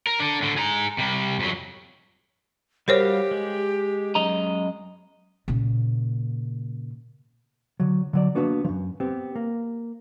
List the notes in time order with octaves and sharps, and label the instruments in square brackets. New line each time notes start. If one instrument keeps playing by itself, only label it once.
[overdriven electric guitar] A#4
D4 A4
A2 D3
G#4 A#5
C3 G3
F2 F#3
[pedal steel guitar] G3 F#4 F5 [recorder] G4 [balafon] A#4 C5 C#5
[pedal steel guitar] G#3
[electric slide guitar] F#2 D#5 A#5
[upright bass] A#2 C#3
[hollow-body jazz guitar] D3 F#3
D3 F#3 D5
A#3 B3 D4 F#4 G#4 B4
F#2 F3
B3 C4 G4
A#3